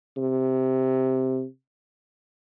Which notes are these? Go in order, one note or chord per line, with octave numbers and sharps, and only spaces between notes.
C3